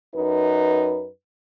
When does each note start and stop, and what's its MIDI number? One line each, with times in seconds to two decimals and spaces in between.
0.14 1.08 42
0.14 1.08 63
0.14 1.08 71